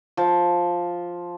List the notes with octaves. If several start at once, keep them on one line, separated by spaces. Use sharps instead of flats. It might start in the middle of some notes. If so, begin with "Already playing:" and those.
F3